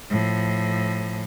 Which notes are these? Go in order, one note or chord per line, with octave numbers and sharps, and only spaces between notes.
A2 F3